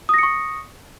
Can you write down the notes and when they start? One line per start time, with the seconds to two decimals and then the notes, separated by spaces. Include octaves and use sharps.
0.09 D#6
0.14 A#6
0.18 C#7
0.23 C#6